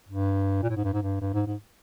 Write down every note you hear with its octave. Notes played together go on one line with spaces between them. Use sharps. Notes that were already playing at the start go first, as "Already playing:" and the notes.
G2
A#2
A2
G#2
G2
G#2
G2
G2
G#2
G#2